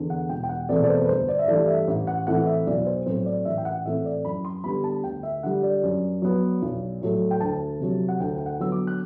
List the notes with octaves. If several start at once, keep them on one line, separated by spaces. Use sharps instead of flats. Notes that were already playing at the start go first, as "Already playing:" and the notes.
Already playing: E2 D3
F#5
E1 G5
G5
F#5
E2 B2 A3 C4 D5
D5
C5
B4
G1 C5
D5
E5
G2 E3 A3 D5
E5
A1
F#5
A2 E3 A3 C4 F#5
E5
B1 D5
C5
A2 F#3 C4 C5
D5
A1 E5
G5
F#5
A2 E3 A3 C4 E5
D5
F#2 B5
C6
D3 G3 B3 B5
A5
D2 G5
E5
D3 G3 F#5
D5
F#2
F#3 B3
B1
A2 F#3 A3
G5
D2 A5
C3 F#3
F#5
D2 G5
G5
F#5
D3 F#3 B3 E6
D6
F#6